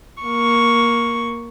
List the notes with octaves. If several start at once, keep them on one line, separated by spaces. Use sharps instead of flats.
A#3 C#6